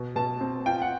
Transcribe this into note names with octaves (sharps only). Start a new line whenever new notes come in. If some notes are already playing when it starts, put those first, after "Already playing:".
Already playing: B2
B2 A5
C4
F4 G5
F#5